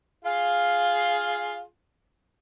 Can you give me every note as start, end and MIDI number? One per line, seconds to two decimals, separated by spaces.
0.25 1.62 65
0.25 1.62 68
0.25 1.62 77